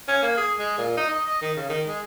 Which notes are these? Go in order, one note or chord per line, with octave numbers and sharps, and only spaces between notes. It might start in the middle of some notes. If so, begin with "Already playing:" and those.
C#4
A#3
G#4
G#3
A#2
D#4
D#5
D#5
D#3
C#3
D#3
G#3